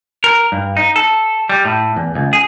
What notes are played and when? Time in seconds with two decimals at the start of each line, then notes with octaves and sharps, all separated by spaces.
0.24 A#4
0.52 G2
0.77 D#4
0.96 A4
1.49 G3
1.65 A2
1.96 E2
2.15 C#2
2.33 G#4